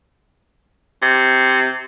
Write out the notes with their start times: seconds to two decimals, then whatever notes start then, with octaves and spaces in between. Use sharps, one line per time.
1.02 C3